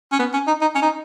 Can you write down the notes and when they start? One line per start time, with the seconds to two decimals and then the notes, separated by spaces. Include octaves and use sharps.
0.12 C#4
0.20 B3
0.33 C#4
0.47 D#4
0.61 D#4
0.75 C#4
0.82 D#4